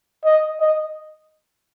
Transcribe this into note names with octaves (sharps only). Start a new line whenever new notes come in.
D#5
D#5